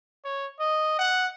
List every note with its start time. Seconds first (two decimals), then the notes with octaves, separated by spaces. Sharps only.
0.24 C#5
0.60 D#5
0.99 F#5